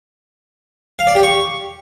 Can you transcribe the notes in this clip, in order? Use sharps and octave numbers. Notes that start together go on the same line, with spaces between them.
F5
D5
G4
C#6